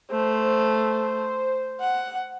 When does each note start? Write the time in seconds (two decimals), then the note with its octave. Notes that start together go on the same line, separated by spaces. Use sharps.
0.11 A3 C5
1.80 F#5